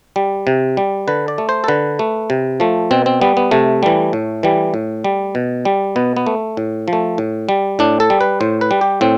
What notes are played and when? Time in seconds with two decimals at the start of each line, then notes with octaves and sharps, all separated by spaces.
0.16 G3
0.47 C3
0.77 G3
1.08 D3 B4
1.28 D5
1.38 A3
1.49 C5
1.64 A4
1.68 D3 B4
1.99 A3
2.30 C3
2.60 F3 A3
2.91 B2 C4
3.06 C4
3.21 G3 B3
3.37 B3
3.51 C3 A3
3.83 E3 G3
4.13 A2
4.43 E3 G3
4.74 A2
5.04 G3
5.35 B2
5.65 G3
5.96 B2 B3
6.17 B3
6.26 A3
6.57 A2
6.88 F3
6.93 A3
7.18 A2
7.49 G3
7.79 A2 D4
8.00 A4
8.10 G3
8.21 B4
8.40 A2 C5
8.61 B4
8.71 G3
8.81 G4
9.01 A2 C4